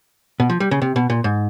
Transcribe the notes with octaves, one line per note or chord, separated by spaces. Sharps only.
B2
F3
G3
C#3
C3
B2
A#2
G#2